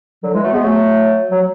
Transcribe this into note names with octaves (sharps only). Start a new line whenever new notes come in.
D3 F#3
E3 G#3
F#3 A3
G#3 B3
F#3 A3
F#3